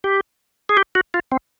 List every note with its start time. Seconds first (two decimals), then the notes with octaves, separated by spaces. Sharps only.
0.04 G4
0.69 G#4
0.77 G4
0.95 F#4
1.14 F4
1.32 C4